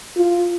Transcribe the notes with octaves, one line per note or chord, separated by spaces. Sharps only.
F4